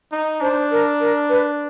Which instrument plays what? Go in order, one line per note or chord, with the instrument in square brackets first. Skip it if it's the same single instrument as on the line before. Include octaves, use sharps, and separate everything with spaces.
[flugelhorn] D#4
[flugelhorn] D4 [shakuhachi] C5
[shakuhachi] A#4
A#4
B4